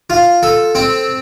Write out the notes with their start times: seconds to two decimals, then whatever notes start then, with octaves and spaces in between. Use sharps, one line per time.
0.10 F4
0.43 A4
0.75 C4